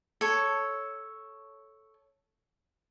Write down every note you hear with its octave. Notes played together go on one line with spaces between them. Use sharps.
A4 C#5